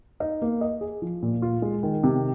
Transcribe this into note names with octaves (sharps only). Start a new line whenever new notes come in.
D#4
A#3
D#5
G#4
F3
A#2
F4
G#3
D#3
C3